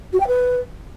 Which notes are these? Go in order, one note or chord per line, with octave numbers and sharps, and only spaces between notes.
F#4
G5
B4